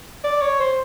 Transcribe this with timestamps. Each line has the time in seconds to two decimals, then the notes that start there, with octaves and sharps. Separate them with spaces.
0.24 D5
0.41 C#5
0.60 C5